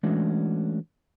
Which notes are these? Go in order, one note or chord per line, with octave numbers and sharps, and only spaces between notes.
E3 G#3 A3 C#4 D4 F#4